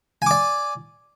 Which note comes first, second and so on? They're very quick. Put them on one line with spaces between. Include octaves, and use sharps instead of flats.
G#5 D6 D5